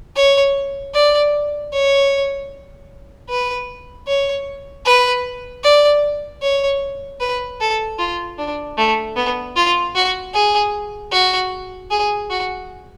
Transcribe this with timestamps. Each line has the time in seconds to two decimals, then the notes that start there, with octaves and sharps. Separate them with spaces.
0.16 C#5
0.94 D5
1.73 C#5
3.29 B4
4.07 C#5
4.85 B4
5.64 D5
6.42 C#5
7.20 B4
7.61 A4
7.99 F4
8.38 D4
8.78 A3
9.16 B3
9.56 F4
9.95 F#4
10.34 G#4
11.12 F#4
11.91 G#4
12.30 F#4